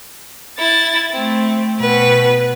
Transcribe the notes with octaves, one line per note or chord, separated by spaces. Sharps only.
E4 A6
A3 C4
B2 B4